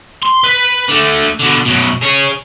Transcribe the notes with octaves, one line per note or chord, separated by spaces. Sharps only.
C6
B4
D3 A3
B2 D3
F#2 B2
G#4 C#5